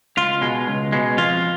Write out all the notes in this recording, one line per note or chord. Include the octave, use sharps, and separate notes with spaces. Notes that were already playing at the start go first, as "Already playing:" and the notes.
C#2 F4
B2 G#3
C#2
B2 G#3
F2 F4